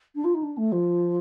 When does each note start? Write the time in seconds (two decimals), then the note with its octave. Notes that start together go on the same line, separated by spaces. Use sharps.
0.15 D4
0.24 F4
0.34 D#4
0.43 D4
0.57 A3
0.72 F3